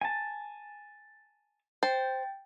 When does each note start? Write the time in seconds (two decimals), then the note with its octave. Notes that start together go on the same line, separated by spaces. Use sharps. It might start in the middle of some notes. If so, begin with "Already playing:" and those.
0.01 G#5 A5
1.83 C5 G5 A6